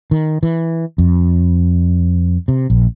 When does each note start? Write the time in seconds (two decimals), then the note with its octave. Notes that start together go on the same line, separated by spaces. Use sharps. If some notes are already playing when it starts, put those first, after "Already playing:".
0.11 D#3
0.43 E3
0.98 F2
2.48 C3
2.70 A#1